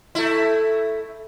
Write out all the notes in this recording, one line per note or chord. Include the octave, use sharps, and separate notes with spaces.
A3 E4